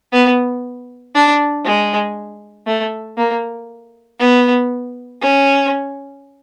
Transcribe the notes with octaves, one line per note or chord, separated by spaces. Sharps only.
B3
D4
G#3
A3
A#3
B3
C#4